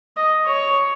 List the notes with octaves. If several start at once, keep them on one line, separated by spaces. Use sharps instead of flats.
D#5
C#5